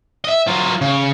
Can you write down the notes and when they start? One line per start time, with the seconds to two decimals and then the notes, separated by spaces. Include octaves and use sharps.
0.24 D#5 E5
0.48 F#3 F4
0.81 C#3